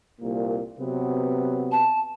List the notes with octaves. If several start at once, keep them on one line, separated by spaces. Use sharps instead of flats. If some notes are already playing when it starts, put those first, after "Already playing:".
C2 A#2 A#3
C3 F#3 B3
A5